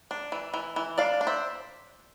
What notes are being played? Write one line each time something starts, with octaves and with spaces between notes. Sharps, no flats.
D4
E3
E3
E3
D4 D5 F5
D4
C5 E5